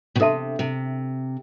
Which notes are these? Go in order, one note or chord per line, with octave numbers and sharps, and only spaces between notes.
B2
C3 D4 A4 E5 A5 C6
C3